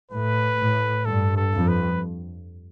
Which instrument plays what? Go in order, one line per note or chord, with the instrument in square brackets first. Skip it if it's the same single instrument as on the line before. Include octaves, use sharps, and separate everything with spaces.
[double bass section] A2 [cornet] B4
[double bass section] A2
[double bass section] G2 [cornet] A4
[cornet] A4
[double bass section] F2
[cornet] B4